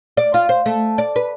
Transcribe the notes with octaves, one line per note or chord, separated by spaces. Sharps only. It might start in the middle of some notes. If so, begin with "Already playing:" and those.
D5
F4
C5
A3
D5
B4